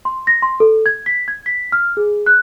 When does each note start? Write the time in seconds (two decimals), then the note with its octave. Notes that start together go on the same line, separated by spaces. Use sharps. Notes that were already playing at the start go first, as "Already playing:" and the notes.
0.05 C6
0.27 A#6
0.42 C6
0.60 A4
0.86 G#6
1.06 B6
1.28 G#6
1.46 B6
1.72 F6
1.97 G#4
2.26 F#6